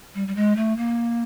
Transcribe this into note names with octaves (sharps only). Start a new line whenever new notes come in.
G3
G3
G#3
A3
A#3